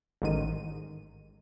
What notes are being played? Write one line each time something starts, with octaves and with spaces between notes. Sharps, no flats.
A1 G#2 D#3 D#7